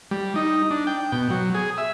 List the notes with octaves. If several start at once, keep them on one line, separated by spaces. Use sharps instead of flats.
G3
D#4
D4
G5
B2
F#3
G#4
E5